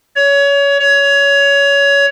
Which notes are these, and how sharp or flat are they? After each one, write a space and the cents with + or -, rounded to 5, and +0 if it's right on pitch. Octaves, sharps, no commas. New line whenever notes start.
C#5 +25
C#5 +20